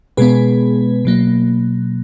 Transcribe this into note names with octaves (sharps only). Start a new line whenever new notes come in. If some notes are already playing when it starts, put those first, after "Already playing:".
B2 G#3 B3 G#4 B4
B2 F#3 A#3